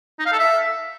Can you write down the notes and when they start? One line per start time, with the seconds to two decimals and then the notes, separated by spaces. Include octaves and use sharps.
0.19 D#4
0.26 F5
0.32 A4
0.39 E5